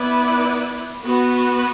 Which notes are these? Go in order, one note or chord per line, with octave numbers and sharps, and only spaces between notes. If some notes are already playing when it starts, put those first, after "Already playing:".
Already playing: B3 E4 B4 D5
B3 F#4 B4